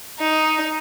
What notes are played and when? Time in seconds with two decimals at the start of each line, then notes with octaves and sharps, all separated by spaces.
0.19 D#4